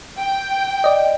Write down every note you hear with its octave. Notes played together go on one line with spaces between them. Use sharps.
G5
D5 D#5